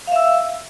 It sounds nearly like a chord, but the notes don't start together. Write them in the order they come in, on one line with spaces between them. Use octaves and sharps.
F5 E5 E6